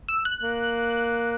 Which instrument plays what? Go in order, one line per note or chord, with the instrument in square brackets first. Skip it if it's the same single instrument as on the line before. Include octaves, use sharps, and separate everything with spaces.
[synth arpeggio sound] E6
F#6
[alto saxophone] A#3